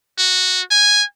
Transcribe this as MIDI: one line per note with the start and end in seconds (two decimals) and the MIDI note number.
0.18 0.61 66
0.71 1.04 80